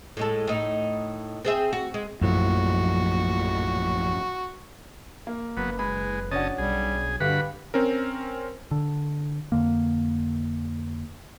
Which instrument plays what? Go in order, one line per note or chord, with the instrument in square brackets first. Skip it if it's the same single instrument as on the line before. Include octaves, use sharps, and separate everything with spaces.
[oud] A2 G#3 A4
A2 D#4
C4 G#4 E5
F#4
G#3
[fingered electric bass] A#1 A2 F3 [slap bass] F#2 [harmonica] F#4
[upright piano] A#3
[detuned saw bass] F#1 [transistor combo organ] F#3 B3 [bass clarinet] B4
[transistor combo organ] G#3 [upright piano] B5
[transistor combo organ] C#3 D#5 A5 [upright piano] C#4 D4 F#4
[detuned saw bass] B1 [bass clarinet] G3 [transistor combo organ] G#4
[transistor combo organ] G2 F#4 B5 [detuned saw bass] D3 [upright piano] G4 F5 [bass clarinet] B4
[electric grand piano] C4 C#4 A#4
[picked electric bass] D3
F2 D3 A#3